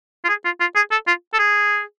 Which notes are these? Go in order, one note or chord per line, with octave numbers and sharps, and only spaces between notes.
F4
G#4
F4
F4
G#4
A4
F4
A4
G#4